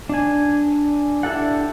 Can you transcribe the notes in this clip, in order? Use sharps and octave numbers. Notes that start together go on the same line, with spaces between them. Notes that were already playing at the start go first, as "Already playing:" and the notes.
D4 G#5
D4 E4 G4 A4 F#5